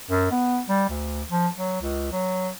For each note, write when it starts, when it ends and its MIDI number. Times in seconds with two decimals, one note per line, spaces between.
0.10 0.27 42
0.31 0.60 59
0.69 0.86 55
0.90 1.23 38
1.30 1.48 53
1.56 1.78 54
1.81 2.11 37
2.12 2.50 54